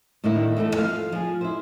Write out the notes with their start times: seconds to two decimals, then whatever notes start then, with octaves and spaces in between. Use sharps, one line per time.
0.24 A2 D3 D#3 A#3 E4
0.57 E2 A3 A4
0.75 F3 F5
1.12 F3 G#4
1.41 E4 C5